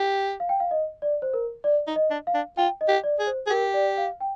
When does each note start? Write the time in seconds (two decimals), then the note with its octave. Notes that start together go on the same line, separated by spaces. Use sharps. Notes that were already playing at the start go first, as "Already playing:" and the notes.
Already playing: G4
0.40 F5
0.49 G5
0.60 F5
0.71 D#5
1.02 D5
1.22 C5
1.34 A#4
1.64 D5
1.87 D#4
1.96 D#5
2.11 D4
2.27 F5
2.34 D4
2.57 F4 G5
2.81 D#5
2.88 G4
3.04 D5
3.20 G#4
3.27 C5
3.47 G#4
3.50 G4 A#4
3.74 D5
3.97 F5
4.21 G5